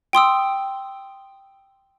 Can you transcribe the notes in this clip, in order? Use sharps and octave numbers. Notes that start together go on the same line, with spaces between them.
G5 C6 D#6 E6